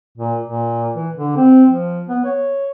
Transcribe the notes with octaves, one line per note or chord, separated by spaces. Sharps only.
A#2
A#2
E3
D3
C4
F3
B3
C#5